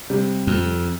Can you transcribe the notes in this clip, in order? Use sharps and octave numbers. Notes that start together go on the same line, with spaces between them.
C3 G3
F2